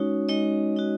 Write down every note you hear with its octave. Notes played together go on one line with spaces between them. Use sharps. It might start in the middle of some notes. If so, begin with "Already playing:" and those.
Already playing: G#3 C#4 D#4 F#4 C#5
G#3 D#4 D#5
D#4 F#4